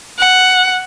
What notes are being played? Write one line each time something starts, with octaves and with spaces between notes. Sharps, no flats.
F#5